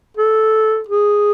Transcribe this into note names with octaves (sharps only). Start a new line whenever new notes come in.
A4
G#4